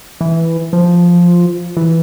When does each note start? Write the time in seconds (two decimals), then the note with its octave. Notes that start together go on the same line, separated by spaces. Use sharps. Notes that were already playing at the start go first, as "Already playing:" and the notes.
0.21 E3
0.73 F3
1.77 E3